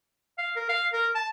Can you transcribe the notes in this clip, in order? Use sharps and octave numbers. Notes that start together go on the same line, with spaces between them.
F5
A#4
F5
A#4
A5